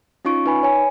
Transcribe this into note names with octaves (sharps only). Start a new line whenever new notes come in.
C#4 D#4 F4 C#6 D7
D#4 B4 G#5 B5
C#5 G#5